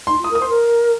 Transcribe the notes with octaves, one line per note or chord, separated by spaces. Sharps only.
D#4 C6
F4
D#6
A#4
D#6
C5 C6
A#4